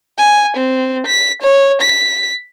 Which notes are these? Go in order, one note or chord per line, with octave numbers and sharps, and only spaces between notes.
G#5
C4
B6
C#5
B6